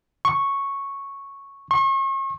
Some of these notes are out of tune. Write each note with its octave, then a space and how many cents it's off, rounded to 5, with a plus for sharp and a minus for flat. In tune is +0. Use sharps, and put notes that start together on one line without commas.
C#6 -5
C#6 -40